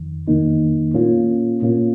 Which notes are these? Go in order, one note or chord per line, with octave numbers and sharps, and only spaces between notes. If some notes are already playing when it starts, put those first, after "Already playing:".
Already playing: F2 D#3
F2 D#3 A#3 D#4
A#2 A#3 C#4 F4
A#2 A#3 C#4 F4